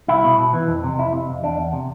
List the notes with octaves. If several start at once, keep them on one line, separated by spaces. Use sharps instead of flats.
C2 E4
B2
B2
E3
F2
C3
F2 E4
C3
F2
E2 D4
E2
C3